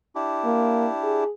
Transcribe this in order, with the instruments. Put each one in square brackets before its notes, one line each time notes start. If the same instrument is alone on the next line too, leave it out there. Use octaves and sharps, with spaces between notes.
[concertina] D4 E4 G4
[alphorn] A#3
G#4